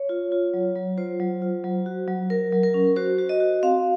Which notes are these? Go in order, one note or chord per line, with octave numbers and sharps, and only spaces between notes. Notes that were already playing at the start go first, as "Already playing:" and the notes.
Already playing: C#5
F4
F4
F#3
F#3
F4 C5
F#3
F4
F#3
F#4
F#3
F#3 A#4
F#3
A#4
C#4
F#4 C5
F#4
D#5
F#4
C4 F5